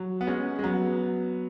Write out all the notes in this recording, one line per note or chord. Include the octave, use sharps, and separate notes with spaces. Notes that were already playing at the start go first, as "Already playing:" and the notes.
Already playing: F#3
B3
G#3 C#4
G#3
F#3 B3